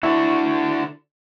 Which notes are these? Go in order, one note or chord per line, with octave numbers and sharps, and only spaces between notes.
D3 D4 E4 F#4